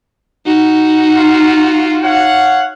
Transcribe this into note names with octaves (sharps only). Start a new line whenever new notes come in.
D#4 F#4
F4
C#5 F5 F#5